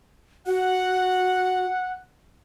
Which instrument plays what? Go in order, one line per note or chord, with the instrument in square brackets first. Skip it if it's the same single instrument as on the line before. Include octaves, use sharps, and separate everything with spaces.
[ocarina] F#4 [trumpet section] F#5